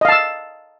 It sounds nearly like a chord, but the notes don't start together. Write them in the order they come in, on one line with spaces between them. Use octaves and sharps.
D#5 F5 A5 E6